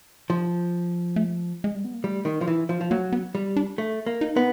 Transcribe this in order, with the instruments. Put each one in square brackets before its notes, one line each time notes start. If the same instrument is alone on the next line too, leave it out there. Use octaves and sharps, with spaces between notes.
[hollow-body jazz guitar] F3
[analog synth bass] A3
G#3
G3
B3
A#3
[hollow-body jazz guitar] G3 [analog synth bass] A3
[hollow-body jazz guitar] D#3
F3
E3
F3
F3
[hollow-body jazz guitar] F#3 [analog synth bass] A#3
[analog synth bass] B3
[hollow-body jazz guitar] G3
[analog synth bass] D4
[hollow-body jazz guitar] A3
A#3
[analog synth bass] D#4
[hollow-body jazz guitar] B3